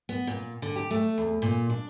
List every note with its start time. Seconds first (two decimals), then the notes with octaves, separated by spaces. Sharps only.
0.09 B3
0.27 A#2
0.62 D3
0.76 G4
0.91 A3
1.18 E2
1.42 A#2
1.70 D4